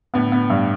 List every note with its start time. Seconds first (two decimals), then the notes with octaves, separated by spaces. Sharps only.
0.14 A2 D3 B3
0.32 B3
0.50 G2